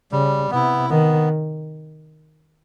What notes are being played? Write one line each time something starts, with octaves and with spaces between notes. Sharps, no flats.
C#3 G3
C3 B3 E4
D#3 B3